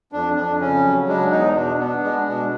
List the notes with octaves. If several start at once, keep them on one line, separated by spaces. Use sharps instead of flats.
F2 D4
F2 D4
C#3 C#4
F#3
G#3 D4
E2 D#4
B2 D4
B3 D4
G#3 D4
B2 D4